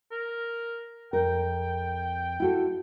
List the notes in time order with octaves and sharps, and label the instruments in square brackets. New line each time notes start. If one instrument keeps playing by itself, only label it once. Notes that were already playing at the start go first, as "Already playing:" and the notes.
[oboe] A#4
[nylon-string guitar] F2 A#4 [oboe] G5
[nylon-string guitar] E4 F#4 A4